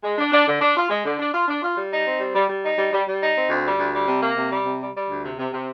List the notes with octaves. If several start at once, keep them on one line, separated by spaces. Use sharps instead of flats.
G#3
D4
D4
D3
D4
F4
G#3
D3
D4
F4
D4
F4
G3
D#4
C4
G3
G3
G3
D#4
G3
G3
G3
D#4
C4
D2
G3
D2
G3
C3
A#3
C3
G3
C3
G3
G3
D2
C3
C3
C3